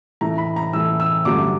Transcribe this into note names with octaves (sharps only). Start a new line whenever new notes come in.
A2 E3 A3 A#5
B5
A#5
A2 E3 A3 E6
E6
G2 D3 F#3 A3 D6